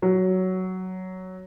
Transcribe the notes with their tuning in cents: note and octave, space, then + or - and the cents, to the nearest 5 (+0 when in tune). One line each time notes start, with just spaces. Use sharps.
F#3 +10